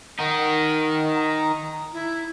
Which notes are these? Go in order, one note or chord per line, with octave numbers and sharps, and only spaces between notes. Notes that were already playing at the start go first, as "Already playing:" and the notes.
D#3 D#4 F#5
A#5
E4